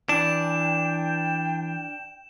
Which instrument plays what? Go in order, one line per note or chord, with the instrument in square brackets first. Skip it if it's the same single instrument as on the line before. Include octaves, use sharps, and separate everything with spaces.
[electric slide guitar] E3 [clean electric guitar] D4 [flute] G5 [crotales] E7